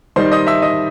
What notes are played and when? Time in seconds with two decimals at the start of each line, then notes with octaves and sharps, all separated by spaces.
0.16 D#3 G3 D#4 C5 C6
0.32 D#5 D#6
0.47 E5 E6
0.62 D#5 D#6